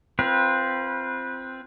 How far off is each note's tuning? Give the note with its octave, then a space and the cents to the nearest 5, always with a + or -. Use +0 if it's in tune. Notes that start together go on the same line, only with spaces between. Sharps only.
C4 +0 F4 -10 B4 -20